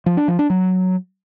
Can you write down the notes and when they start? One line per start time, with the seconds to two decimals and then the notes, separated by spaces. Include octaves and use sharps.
0.06 F3
0.17 D4
0.28 F3
0.39 D4
0.50 F#3